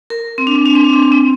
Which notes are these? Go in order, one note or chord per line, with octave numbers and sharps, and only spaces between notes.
A#4
C4
D4
C4
D4
C4
D4
C4
D4
C4